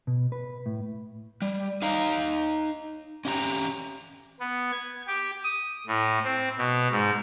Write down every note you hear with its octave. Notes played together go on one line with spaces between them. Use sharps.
B2
B4
A2
G3
D#4 F5 A#5
C#4 G4 A#5
B3
G#6
G4
D#6
A2
C4
B2
G#2